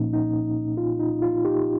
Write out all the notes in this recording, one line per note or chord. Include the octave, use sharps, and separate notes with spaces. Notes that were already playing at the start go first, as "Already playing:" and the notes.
Already playing: C2 A#2 F3 A#3 C#4 D#4
D#4
F4
D#4
F4
D#4 G4